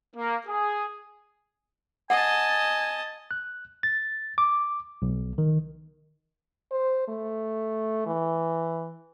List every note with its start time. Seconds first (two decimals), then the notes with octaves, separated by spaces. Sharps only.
0.16 A#3
0.47 G#4
2.10 D#5 F#5 G#5 A5
3.31 F#6
3.83 A6
4.38 D6
5.02 B1
5.38 D#3
6.72 C5
7.08 A3
8.07 E3